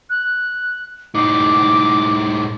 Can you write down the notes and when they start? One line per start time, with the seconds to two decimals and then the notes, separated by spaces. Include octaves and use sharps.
0.10 F#6
1.15 A2 D#4 D6